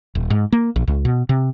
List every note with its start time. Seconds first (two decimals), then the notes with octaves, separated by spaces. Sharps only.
0.15 D#1
0.30 G#2
0.52 A#3
0.76 A#1
0.88 C#2
1.05 B2
1.29 C3